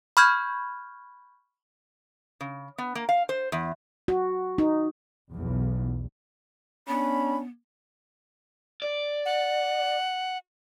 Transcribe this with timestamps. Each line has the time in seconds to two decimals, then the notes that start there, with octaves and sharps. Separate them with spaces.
0.17 B5 C#6 F6 G6 G#6
2.41 C#3
2.78 B3
2.95 A#3
3.09 F5
3.29 C5
3.52 E2
4.08 F#4
4.58 D#4
5.31 B1 E2
6.88 B3 C#4 D4 B5
8.82 D5
9.25 F#5